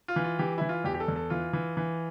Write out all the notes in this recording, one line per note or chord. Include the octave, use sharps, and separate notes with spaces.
F4
E3
F4
E3 G4
E3 E4
F4
E2 G4
G4
A4
E2
A4
E3 F4
E3
E3